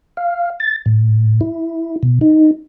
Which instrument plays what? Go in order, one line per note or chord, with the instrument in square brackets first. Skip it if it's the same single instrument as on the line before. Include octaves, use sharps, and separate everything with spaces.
[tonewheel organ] F5
A6
A2
E4
B2
D#4